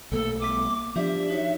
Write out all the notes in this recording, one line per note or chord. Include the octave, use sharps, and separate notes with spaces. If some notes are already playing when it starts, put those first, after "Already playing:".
B1 A3 A#3 A4
G3 B3 E5 D6
F3 D4 G4 D5 E5
D#4 F#4 C#5